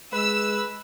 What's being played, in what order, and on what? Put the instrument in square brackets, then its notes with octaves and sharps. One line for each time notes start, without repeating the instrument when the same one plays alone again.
[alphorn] G#3 [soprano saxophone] B4 [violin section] E6